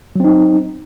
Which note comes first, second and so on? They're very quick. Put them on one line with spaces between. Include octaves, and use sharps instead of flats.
F#3 C4 D#4